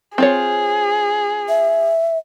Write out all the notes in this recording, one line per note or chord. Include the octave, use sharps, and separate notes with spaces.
C4 F4 G#4 C#5
E5